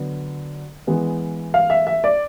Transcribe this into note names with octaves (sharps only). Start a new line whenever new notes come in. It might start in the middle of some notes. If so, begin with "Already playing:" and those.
Already playing: D3 F#3 B3
E3 G#3 B3
F5
E5
E5
D5